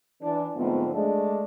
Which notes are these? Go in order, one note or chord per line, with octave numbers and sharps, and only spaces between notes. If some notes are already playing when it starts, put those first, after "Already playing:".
E3 D4
G#2 D3 F3 A3 B3 C4
G#3 A3 D4